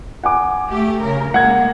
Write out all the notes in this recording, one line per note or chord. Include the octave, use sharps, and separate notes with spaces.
F#5 G#5 D6
A3 G4
C#3 A#4
G#3 A#3 F#5 G#6